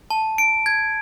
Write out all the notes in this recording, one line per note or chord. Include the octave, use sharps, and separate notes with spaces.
A5
D7
G#6